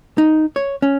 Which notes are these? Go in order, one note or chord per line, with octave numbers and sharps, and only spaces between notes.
D#4
C#5
C#4